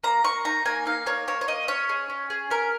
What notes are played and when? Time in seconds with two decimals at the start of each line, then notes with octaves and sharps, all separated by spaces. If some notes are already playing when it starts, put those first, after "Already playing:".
0.04 A#3 A#5
0.24 A#3 C#6
0.45 D#4 A#5
0.66 A#3 G#5
0.86 D#4 F5
1.06 A#3 C#5
1.28 A#3 C#5
1.41 C#5
1.48 A#3 D#5
1.68 C#4 C#5
1.89 G#4
2.10 C#4
2.30 G#4
2.51 C#4 A#4